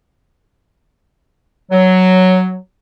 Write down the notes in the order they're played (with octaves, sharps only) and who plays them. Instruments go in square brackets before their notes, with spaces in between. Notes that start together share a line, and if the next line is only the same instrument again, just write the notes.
[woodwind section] F#3